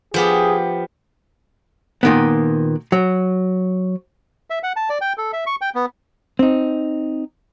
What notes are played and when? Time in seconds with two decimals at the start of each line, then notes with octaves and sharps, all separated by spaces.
0.14 F3 B3 G4 G#4
2.03 A#2 D#3 B3
2.92 F#3
4.50 E5
4.63 F#5
4.76 A5
4.90 D5
5.01 G5
5.18 A4
5.33 E5
5.47 C#6
5.61 G5
5.75 B3
6.39 C4 D#4